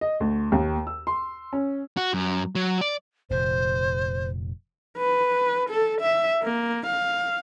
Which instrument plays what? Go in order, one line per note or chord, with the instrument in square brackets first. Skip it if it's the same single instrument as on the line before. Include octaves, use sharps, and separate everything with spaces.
[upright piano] D#5
D2
D#2
E6
C6
C#4
[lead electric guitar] F#4
F#2
F#3
D5
[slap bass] F1 A#2 [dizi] C5
[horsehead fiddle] B4
A4
E5
A#3
F5